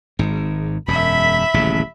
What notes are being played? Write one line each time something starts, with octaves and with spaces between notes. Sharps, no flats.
G#1 G#2
E1 F#2 E5 B5
D#1 A1 C#3